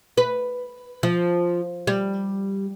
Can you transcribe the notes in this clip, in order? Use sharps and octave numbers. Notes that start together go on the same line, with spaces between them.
B4
F3
G3